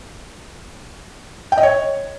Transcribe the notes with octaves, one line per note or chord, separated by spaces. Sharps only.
G5
D#5
C#5